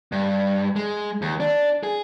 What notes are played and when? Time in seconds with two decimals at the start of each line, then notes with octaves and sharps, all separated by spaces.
0.12 G2
0.76 G#3
1.22 D#2
1.40 D4
1.83 G#4